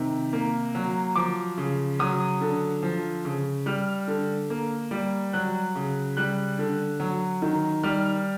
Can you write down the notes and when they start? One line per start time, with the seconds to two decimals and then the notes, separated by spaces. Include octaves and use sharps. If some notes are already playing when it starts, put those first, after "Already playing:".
Already playing: C3 D#3
0.33 A#3
0.75 F#3
1.16 F3 D6
1.57 C#3
1.99 F#3 D#6
2.41 D3
2.83 F3
3.25 C#3
3.66 G3 F6
4.07 D3
4.50 A#3
4.91 G3
5.33 F#3 F#6
5.75 C#3
6.17 G3 F#6
6.59 D3
7.00 F#3
7.42 D#3
7.83 G3 F6